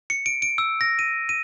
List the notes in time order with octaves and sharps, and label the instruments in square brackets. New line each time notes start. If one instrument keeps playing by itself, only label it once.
[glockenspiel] C#7
D7
D7
E6
A#6
D#7
D#7